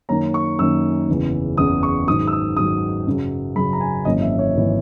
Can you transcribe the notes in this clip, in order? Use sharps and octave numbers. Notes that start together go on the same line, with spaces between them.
F#2 D#3 A#3 C#4 A#5
C#6
F#2 D#3 A#3 C#4 E6
F#1 E2 C#3 E3
F#1 E2 C#3 E3 D#6
C#6
G#2 D#3 F#3 D#6
E6
D#6
G#2 D#3 F#3 D#6
F#2 C#3 F#3
F#2 C#3 F#3 B5
A#5
G#5
G#1 F#2 E3 A#3 C#4 D#5
E5
C#5
G#1 E3 A#3 C#4